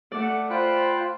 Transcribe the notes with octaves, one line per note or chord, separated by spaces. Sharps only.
A3 D5 F#5
F4 C5 G5 B5 F#6